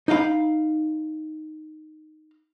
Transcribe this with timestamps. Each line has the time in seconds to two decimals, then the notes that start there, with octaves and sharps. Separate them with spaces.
0.08 D#4 D#5 F5 G5 B5